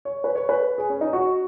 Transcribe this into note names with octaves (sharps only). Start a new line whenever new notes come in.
C#5
B4
C#5
B4
G#4
C#4
D#4
F#4